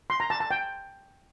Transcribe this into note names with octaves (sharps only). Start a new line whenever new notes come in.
C6
A#5
A5
A5
G5